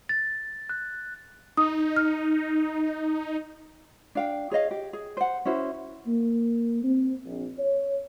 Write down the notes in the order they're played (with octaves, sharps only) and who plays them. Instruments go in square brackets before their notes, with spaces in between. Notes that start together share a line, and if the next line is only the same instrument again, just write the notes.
[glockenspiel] A6
F#6
[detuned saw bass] D#4 [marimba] D#6
[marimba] F6
[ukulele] D4 F5 G5
G#4 C#5 D#5 F5
G4
G#4
C5 F#5
C#4 E4 F#4 C5
[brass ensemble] A#3
C4
A#1
C#5